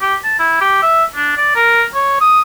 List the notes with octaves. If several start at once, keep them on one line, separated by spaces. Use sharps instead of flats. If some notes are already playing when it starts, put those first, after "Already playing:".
G4
A5
E4
G4
E5
D4
D5
A#4
C#5
D#6